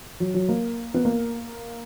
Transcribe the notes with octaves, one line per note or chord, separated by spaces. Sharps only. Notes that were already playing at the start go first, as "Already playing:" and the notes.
F#3
F#3
A#3
B3
A#3